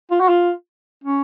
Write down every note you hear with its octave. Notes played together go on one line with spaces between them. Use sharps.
F4
F#4
F4
C#4